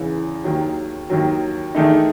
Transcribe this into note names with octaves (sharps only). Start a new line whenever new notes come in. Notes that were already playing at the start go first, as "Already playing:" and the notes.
Already playing: E2 C#3 E3
D#2 D#3 F#3
D#2 D#3 F#3
E2 D#3 A3 D#4